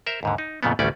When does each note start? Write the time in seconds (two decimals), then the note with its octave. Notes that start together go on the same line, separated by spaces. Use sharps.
0.06 A#4 C5 E5
0.23 D#2 G#2 D3
0.38 D#4
0.63 F2 A#2 C#3 F3 A3 B3
0.79 A1 D2 G3 A3 C#4 D5